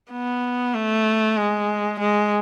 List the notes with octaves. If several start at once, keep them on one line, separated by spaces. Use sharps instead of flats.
B3
A3
G#3
G#3